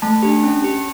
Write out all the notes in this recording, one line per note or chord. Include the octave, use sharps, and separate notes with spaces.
A3 A5
D4 G4
C#4
G4